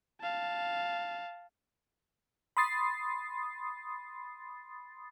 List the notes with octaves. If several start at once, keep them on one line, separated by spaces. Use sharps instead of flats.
F5 A5
B5 C6 D#6 A6 C7